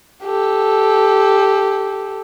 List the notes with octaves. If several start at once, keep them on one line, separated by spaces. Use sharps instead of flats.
G4 A4